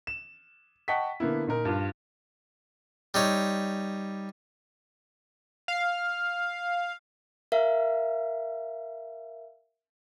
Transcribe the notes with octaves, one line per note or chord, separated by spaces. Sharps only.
E7
D#5 F#5 G5 A5 C#6 B6
D3 A#3 B3 E4
A#2 D#4 A#4
G2 F4
G3 D#4 C#5
F5
A#4 E5 F5